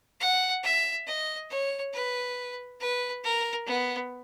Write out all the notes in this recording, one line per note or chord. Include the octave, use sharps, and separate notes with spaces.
F#5
E5
D#5
C#5
B4
B4
A#4
B3